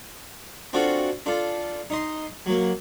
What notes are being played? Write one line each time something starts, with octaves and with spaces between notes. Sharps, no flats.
C4 D4 F4 F#4 A4
D4 F4 A4
D#4 D#5 C6
F#3 A#3